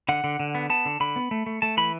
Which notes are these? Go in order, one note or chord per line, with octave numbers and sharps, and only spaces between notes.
D3 F#5
D3
D3
B3
B3 A5
D3
D3 B5
B3
A3
A3
A3 A5
E3 B5